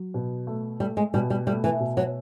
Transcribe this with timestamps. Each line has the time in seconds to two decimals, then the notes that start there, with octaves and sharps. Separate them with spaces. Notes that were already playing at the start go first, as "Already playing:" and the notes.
Already playing: F#3
0.14 B2
0.47 A3
0.80 G3 A3
0.97 G#3
1.14 B2 G3
1.30 G3
1.47 G3 A3
1.64 E3
1.80 B2
1.97 F#3